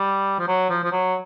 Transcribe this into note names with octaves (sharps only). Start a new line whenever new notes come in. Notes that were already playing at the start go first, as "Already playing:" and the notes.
Already playing: G3
F3
F#3
F3
F3
F#3